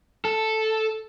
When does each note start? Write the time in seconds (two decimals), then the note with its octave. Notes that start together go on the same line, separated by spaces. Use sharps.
0.25 A4